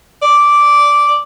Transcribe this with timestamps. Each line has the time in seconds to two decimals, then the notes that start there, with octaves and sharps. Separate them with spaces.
0.22 D5